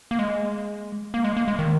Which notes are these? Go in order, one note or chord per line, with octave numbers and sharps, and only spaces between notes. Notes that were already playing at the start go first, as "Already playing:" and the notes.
A#3
G#3
A#3
G#3
A#3
G#3
D#3